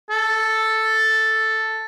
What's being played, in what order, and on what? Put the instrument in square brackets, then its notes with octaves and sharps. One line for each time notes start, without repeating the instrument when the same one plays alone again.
[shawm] A4